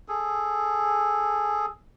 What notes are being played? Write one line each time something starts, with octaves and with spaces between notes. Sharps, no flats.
G#4 A4